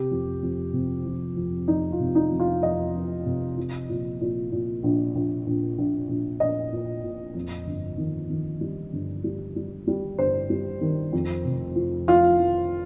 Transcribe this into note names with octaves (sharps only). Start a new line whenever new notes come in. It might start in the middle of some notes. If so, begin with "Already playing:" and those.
Already playing: C3 G4
F2
F2
C3
F3
F2
F2 D#4
F4
C3
D#4
F2
F4
F2 D#5
F3
C3
F3
A#2
A#2
A#2
A#1
A#1
A#1
A#1
A#1
A#1 D#5
A#2
A#2
F2
G1
D#3
D#3
G3
G1
G3
G3
G3
G1 C5
G3
D#3
F2
F1
F3
F3 F4
F3